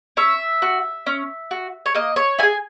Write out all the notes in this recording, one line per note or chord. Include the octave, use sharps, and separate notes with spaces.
C#4 E5
F#4
C#4
F#4
C#5
A#3 D#5
C#5
E4 G#4 G#5